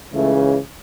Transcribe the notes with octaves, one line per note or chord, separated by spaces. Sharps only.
C#2 C#3 E3 A3